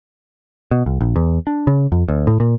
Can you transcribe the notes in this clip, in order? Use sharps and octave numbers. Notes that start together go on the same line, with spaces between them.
B2
C2
A#1
E2
D4
C#3
F2
D2
A2
A#2